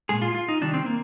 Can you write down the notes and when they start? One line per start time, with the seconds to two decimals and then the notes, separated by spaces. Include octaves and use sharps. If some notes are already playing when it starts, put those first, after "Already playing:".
0.09 A#2 G#3 G#4
0.22 F4
0.35 F4
0.49 D#4
0.61 C3 D#3 G3 D4
0.74 C4
0.86 A#3